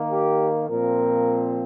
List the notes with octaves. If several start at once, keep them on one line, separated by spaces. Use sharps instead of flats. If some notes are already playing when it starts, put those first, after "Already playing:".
Already playing: D#3 A#3
G4
A#2 F3 C4 A#4